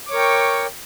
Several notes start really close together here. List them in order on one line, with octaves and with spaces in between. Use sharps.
D6 C#5 A#4 G5 C#6